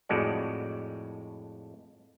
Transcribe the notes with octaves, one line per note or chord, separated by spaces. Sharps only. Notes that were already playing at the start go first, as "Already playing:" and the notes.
F2 A2 G#3 F#4 D5